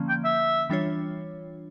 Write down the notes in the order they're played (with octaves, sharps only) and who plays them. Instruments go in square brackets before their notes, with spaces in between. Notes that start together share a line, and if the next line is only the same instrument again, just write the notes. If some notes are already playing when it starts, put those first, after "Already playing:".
Already playing: [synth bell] D3 F3 A#3 C#4
[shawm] G5
E5
[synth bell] E3 G3 D4 F4 C#5